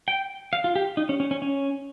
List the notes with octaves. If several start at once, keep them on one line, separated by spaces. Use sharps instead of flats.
G5
F5
F4
G4
D#4
C#4
C#4
C#4
C#4